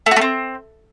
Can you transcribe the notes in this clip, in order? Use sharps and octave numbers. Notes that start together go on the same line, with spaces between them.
A3
F#4
A3
C4